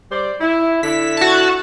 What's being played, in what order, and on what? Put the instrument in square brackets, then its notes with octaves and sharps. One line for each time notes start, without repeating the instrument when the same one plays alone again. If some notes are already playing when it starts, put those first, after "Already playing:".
[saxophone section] G3 C5 D5
E4
[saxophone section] D3 E4 [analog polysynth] B6
[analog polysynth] F#4 A5